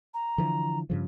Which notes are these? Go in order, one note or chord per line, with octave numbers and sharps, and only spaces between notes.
A#5
D3 E3 F3
G2 C#3 F3